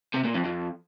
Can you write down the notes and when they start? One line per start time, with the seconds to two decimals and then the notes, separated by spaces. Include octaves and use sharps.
0.14 C3
0.25 A#2
0.35 F2
0.45 F2